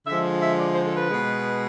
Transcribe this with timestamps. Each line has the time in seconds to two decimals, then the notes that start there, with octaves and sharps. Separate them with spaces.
0.06 D3 F3 G#3 E5
0.40 E5
0.57 D5
0.70 C5
0.84 A4
0.95 B4
1.09 B2 G#3